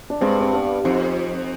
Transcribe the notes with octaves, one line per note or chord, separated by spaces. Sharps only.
D4
G2 G#3 C4
C4
B3 D4
F2 C4 D#4